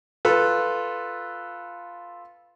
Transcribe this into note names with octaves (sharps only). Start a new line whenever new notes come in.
F4 A4 B4